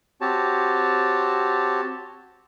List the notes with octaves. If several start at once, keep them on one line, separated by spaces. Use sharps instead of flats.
C4 F#4 G4 C#5 A5